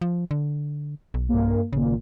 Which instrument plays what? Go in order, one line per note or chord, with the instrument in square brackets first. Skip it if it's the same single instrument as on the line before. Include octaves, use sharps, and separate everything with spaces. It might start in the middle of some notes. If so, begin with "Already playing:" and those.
[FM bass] F3
D3
B1
[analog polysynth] G2 A#3
[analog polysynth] G#1 A#2 [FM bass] C#3